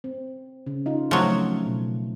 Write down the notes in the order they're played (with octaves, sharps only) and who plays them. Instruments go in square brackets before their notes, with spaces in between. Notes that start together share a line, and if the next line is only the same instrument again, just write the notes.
[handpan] C4
C#3
D#4 F4
[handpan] C#3 A3 C4 [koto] F3 F#3
[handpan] B2